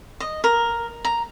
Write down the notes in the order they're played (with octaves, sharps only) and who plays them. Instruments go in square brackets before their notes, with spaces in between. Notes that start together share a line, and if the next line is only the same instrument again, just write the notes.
[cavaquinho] D#5
A#4
A#5